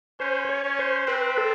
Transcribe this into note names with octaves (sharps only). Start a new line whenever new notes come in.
C#4 C5
C5
C#5
C#4
C5
C4 B4
A4